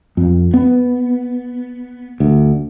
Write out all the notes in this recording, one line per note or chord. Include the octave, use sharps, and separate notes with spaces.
F2
B3
D2